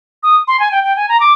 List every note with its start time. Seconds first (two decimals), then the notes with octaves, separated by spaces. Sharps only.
0.23 D#6
0.48 C6
0.60 G#5
0.71 G5
0.84 G5
0.96 G#5
1.09 A#5
1.20 D6